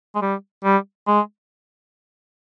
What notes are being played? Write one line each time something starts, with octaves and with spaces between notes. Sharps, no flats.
G#3
G3
G3
G#3